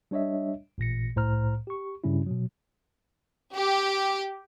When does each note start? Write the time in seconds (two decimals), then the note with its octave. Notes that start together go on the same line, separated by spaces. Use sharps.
0.11 G3 D4 C#5 D#5 E5
0.78 A1 A#2 A#6 C#7
1.16 C2 A2 C5 A#5 F6
1.67 G4 C#6
2.04 G2 C#3 G3 C#4 E4
2.26 B2 F#3
3.54 G4